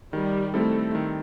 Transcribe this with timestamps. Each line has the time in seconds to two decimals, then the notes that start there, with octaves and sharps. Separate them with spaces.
0.13 D#3 G3
0.54 G3 A3 C4 E4 A4
0.95 D#3